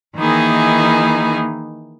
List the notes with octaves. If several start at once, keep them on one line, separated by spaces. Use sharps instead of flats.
D#3 E3 A#3 D#4 E4 G#4